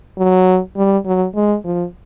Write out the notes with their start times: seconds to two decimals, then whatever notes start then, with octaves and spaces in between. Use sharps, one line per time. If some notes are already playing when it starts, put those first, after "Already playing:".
0.17 F#3
0.77 G3
1.05 F#3
1.35 G#3
1.64 F3